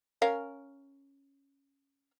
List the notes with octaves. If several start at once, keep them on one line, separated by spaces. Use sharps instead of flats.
C#4 A#4 F5